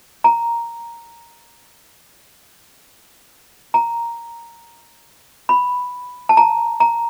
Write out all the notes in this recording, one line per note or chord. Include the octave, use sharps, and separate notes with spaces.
A#5
A#5
B5
A5
A#5
A#5